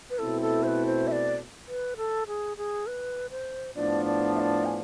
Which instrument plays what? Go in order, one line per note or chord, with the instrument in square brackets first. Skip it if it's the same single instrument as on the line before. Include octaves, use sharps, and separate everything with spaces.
[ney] B4
[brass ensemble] B2 A3 C4 E4 [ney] A4
[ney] A4
C5
B4
C5
E5
D5
B4
A4
G#4
G#4
B4
C5
[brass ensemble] A2 F3 B3 D4 [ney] D5
[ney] D5
E5
D5
G#5